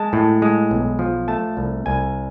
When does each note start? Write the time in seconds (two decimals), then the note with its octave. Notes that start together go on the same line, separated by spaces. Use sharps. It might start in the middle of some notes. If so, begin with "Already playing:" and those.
Already playing: G#3 A5
0.13 A2
0.42 G#3
0.71 B1
0.99 F3
1.28 A3 A5
1.57 C2
1.86 C2 G#5